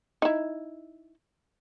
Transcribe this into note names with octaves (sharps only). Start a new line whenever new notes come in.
D#4 E4